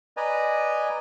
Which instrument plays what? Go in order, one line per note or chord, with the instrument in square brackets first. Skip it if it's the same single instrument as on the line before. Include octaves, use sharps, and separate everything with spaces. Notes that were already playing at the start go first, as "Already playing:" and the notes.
[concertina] B4 D5 D#5 G#5 A#5